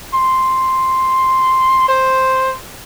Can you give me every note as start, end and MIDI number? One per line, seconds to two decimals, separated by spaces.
0.14 1.84 84
1.88 2.55 72